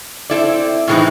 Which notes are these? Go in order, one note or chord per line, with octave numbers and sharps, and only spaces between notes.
C4 E4 A4 D5
A2 E3 G#3 C4 D#4